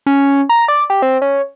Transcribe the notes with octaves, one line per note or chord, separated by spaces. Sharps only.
C#4
A#5
D5
G4
C4
C#4